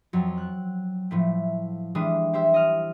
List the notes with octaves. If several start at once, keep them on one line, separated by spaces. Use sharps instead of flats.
F2 F#3
F#6
A2 F3 A3
E3 G3 G#3 D4 D#6
G4 C5 E5
D#5 F6